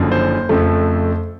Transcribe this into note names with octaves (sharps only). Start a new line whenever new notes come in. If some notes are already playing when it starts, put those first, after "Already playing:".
Already playing: F#1 F#2 D3 F3
C5
F2 C#3 F3 A3